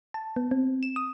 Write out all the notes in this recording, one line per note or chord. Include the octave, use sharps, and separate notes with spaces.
A5
B3
C4
E7
D#6